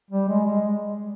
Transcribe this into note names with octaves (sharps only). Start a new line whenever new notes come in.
G3
G#3
G#3